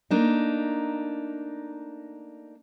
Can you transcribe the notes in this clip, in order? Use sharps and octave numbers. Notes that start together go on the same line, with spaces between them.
A3 A#3 D4 D#4